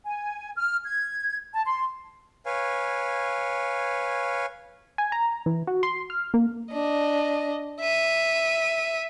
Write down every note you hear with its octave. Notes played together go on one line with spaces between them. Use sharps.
G#5
F6
G#6
A5
C6
B4 C#5 F5 G#5
G#5
A#5
E3
F#4
C6
F6
A#3
D4 D#5
E5 D#7